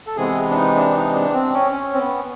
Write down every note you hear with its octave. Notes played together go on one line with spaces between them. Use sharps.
A4
C3 E3 G#3 B3 G#4
D4
D#4
D4
D#4
D4
C4
C#4
C#4
C4
B3